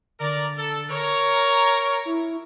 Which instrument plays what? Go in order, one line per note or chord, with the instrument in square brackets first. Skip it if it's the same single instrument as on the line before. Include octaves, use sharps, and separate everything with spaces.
[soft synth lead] D3 [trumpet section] A#4 D5
[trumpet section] A4
A#4 C#5
[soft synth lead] A#5
E4